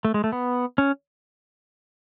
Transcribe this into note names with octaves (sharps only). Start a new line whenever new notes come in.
A3
G#3
A3
B3
C#4